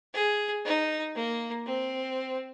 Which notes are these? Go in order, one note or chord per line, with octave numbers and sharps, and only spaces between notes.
G#4
D#4
A#3
C4